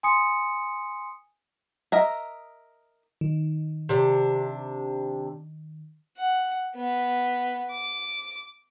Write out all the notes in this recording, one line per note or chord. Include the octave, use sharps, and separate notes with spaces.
G#5 C6 D#6 C#7
A#4 D#5 E5
D#3
C3 D4
F#5
B3
D6